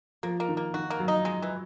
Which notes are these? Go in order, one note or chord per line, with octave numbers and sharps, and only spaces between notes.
F3 A#3
A#3
D#3
A#3
D#3 F#4
A#3
F#3
D#4
G#3
E3